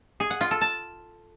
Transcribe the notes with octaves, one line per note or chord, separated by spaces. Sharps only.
G#4
F#5
F4
A4
A5